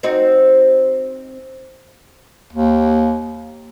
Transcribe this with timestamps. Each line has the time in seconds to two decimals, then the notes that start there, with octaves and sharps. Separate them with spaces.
0.03 C4 D#4 F#4
2.53 D#2